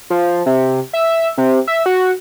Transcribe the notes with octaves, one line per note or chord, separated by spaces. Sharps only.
F3
C3
E5
C3
E5
F#4